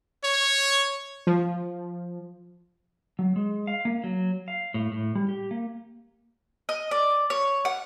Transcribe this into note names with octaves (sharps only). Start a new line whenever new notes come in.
C#5
F3
F#3
G#3
F5
A#3
F#3
F5
A2
A2
G3
G4
A#3
D#5
D5
C#5
F#5